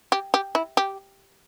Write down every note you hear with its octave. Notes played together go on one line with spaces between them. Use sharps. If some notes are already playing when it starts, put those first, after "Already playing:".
G4
G4
E4
G4